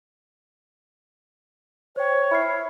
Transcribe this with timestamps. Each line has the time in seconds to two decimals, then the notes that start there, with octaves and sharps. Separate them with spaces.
1.96 C5 C#5 G5
2.31 E4 B5 F6 C7